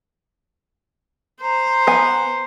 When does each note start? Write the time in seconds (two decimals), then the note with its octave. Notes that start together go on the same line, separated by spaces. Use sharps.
1.42 C5 A#5
1.87 B3 G#5